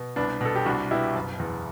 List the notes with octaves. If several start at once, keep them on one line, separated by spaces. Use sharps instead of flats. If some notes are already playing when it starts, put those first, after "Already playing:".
Already playing: B2
C2 B3 D4
B2 A4
G4
C2 D4 F#4
B2 E4 G4
F#1
E2